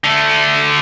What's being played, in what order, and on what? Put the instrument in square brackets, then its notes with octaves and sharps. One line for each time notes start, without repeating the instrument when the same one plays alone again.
[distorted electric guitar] D3 A3